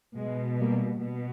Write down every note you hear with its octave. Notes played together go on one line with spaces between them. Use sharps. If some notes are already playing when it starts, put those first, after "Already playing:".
B2 G#3
G3 A#3
B2